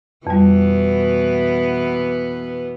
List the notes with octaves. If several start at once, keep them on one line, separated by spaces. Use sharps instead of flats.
F2 B2 E3 G3 B3